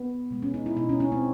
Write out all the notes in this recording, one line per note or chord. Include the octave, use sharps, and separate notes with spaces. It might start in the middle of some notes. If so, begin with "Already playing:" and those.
Already playing: B3
B2 G#3
C#4
D#4
E4
B2 G#3 D#4
C#4
C#4
C4